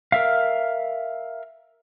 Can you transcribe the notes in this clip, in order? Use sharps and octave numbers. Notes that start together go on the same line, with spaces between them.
A#4 E5 F5